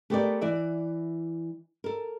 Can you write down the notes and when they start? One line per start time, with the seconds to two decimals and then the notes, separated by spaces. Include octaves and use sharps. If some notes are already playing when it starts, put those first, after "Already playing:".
0.10 A3 B3 G4 A4 A#4 D5
0.41 E3 D5 E5
1.84 A4 A#4